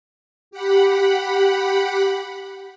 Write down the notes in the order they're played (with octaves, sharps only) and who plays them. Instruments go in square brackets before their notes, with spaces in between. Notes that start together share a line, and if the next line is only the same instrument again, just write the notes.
[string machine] G4 F#5 B5